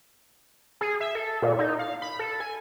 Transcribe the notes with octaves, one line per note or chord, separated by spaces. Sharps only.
G#4
E5
A4
A#2
D#4
F5
B5
A4
G#5